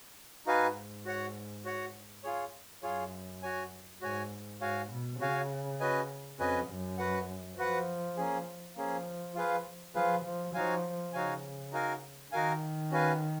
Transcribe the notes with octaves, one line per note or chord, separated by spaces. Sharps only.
G#2 D#4 F#4 B4 F5 G#5
F#4 C#5 F#5
F#4 C#5 F#5
F4 G#4 C#5
F#2 F4 G#4 C#5
F#4 C#5 G#5
G#2 F#4 C#5 G#5
G#2 F#4 C#5 F5 G#5
B2
C#3 F#4 C#5 F5 G#5
C#4 F#4 B4 D#5 G#5
F2 C#4 F#4 B4 D#5 G#5
F#2
F#4 B4 F#5
F3 F#4 B4 F#5
A#3 C#4 G#4
F3 A#3 C#4 G#4
F4 G#4 B4 F5
F3 F4 G#4 B4 F5
F3
F3 D#4 F#4 C#5 F5 G#5
C#3 D#4 F#4 C#5 F5 G#5
D#4 F#4 A#4 F5 G#5
D#3 D#4 F#4 A#4 F5 G#5
C#4 F#4 B4 F5 G#5